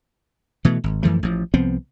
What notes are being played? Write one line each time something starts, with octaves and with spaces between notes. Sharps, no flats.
B2 E3 A3
G#1
F#2 E3 F3 A3
A1 F3
C2 F3 B3 C4